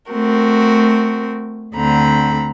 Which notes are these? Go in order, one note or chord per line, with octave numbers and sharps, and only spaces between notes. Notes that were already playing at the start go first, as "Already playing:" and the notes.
A3 C4 F#4 A#4
D2 D3 C4 A#5 B5